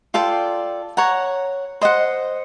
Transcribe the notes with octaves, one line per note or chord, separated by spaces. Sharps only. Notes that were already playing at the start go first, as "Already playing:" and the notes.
F4 A4 D5 G5
C#5 F#5 A#5
C5 D#5 F#5